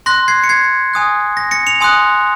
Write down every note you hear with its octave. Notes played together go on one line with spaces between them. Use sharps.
C6 F#6 A#6
G#6 C7
C#7
G#6 C7
G#5 D#6 F#6
A#6
A#6 C#7
C#7 F7
G#5 C6 D#6 F#6